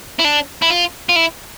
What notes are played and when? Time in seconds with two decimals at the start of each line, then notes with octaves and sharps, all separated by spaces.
0.19 E4
0.24 D4
0.62 E4
0.70 F4
1.09 F4
1.16 E4